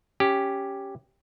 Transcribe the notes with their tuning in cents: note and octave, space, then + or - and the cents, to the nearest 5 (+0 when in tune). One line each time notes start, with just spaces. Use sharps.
C#4 +0 G4 +0